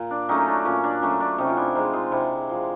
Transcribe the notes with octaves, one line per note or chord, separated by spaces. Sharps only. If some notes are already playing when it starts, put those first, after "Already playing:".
Already playing: A#2
D4
F#3 A3 C#4 D#4
D4
A#2 C#4
D4
F#3 A3 C#4
D4
C3 C#4 D#4
F4
D4 E4
F3 G#3 D#4 F4
D#4 F4
C3 D4 E4
F3 G#3